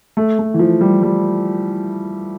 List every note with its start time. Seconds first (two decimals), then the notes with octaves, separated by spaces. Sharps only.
0.17 A3
0.39 A3
0.54 E3
0.59 F3
0.81 G3
1.02 G3